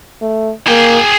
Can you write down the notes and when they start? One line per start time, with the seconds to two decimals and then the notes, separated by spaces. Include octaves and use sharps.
0.22 A3
0.68 A#3 G#4 G5